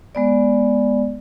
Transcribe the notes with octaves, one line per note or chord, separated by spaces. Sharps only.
G#3 B3 D5